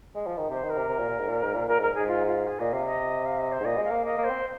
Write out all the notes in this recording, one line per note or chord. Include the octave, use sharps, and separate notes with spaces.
G#3
F3
D#3
C3 C5
D#3
A#4
C3
C3
A#2
A#2
G#2
A#2
G#2
A#2
A#2 A#4
G#2 A#4
G#2 G#4
F4
F4
G#4
A#2 D#5
C3 F5
D#5
F5
D#5
C5
G#2
A#2 D#5
G#3
F5
A#3
A#3 D#5
A#3
C5
C4